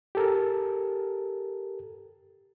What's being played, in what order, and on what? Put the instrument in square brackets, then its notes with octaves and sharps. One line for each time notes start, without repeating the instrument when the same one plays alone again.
[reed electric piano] G4 A4 A#4